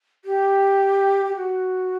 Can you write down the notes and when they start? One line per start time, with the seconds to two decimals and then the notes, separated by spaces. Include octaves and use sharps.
0.25 G4
1.25 G4
1.36 F#4